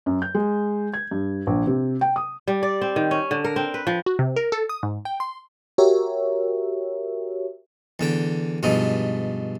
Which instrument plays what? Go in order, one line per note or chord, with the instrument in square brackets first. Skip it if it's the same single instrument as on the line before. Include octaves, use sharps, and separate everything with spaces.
[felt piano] F#2
G6
G#3
G#6
G2
A#1
C3
G5
D#6
[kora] G3
D5
C4
D#3
C#4
D3
A#4
C4
B4
F3
[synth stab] F#4
C3
A#4
A4
D#6
G#2
G5
C6
[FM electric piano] F#4 G4 A#4 C#5 E5
[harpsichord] E2 D3 G5
G2 B2 F3 G#3 D#4